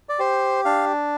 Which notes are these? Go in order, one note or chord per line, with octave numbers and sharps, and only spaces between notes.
D5
G4 C5
D4 F5